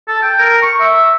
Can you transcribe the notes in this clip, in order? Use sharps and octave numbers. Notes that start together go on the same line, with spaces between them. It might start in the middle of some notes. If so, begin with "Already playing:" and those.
A4
G5
A#4
C#6
E5